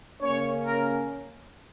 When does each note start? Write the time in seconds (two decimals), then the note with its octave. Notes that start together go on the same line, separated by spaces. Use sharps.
0.21 C#3 A#3 C#4 C#5
0.65 A#4